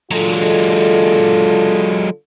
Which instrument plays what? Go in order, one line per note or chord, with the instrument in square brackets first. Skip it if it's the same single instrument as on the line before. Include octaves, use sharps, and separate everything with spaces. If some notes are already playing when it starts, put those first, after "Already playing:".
[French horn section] D3 F4 A4 [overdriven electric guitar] F#3 G#3